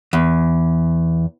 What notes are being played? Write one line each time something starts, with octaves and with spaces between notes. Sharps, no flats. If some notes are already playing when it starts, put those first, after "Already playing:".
E2